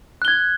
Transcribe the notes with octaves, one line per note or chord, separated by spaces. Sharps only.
F#6 G#6 G7